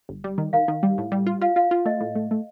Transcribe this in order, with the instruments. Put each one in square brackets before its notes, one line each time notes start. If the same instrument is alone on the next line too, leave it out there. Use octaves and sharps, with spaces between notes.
[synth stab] G1
G3
D#3
[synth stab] D#3 [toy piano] F5
[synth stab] D#3
G3
A2
G3
F4
[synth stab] F4 [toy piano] F5
[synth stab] F4 [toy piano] F5
[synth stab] F4
[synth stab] A3 [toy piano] D#5
[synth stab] A2
A3
A3